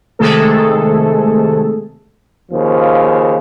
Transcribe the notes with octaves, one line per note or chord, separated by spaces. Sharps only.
C3 D#3 G#3 A3 G#4 A4
D#2 C#3 F3